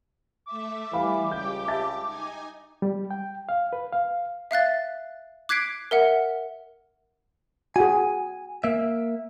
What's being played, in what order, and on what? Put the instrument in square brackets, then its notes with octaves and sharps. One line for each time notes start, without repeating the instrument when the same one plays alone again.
[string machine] A3 E5 [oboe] D6
[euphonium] E3 [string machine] G3 [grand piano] G4 F5 B5
[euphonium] C#2 [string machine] G4 G5 [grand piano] G6
[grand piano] E5 A5 A6
[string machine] D#4 G#5
[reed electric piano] G3
G5
F5
B4
F5
[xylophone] E5 F5 F#6 A6
D6 F#6 G#6 B6 C7 D7
A#4 E5 F#5
[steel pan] F#4 G#4 [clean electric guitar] G#5
[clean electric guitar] A#3 E5